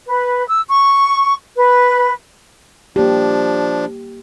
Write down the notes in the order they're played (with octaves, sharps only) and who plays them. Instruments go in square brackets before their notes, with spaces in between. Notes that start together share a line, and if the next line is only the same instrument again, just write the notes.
[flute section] B4
E6
C#6
B4
[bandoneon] F3 D4 [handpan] A#3 G4